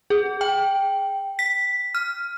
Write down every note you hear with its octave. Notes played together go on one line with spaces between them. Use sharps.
G#4
G5
B6
F6